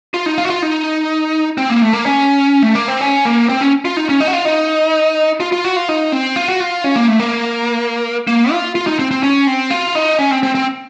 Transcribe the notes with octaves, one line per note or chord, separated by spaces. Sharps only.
F4
D#4
F4
F#4
F4
D#4
C4
A#3
A3
A#3
C#4
A3
A#3
C4
C#4
A#3
C4
C#4
F4
D#4
C#4
D#4
F#4
F4
D#4
F4
F4
F#4
F4
D#4
C4
F4
F#4
F4
C#4
A#3
A3
A#3
A#3
F4
F4
D#4
C4
C4
C#4
C4
F4
D#4
C#4
C4
C4
C4